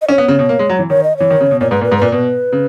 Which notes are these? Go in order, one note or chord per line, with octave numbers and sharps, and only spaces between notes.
D#5
C#4 C#5
B3
C#3
B2
A#3
G#3
F#3
E3
D#3 C#5
D#5
E3 C#5
D#3
C#3
B2
A#2 C#5
G#2 B4
A#2
B4
G#2
A#2 B4
B2 B4
C#3